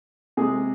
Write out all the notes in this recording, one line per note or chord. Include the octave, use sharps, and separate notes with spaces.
C3 G#3 G#4